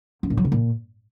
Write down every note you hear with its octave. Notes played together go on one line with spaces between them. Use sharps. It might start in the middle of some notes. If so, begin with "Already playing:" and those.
F#2
A#2
F#3
C3
A#2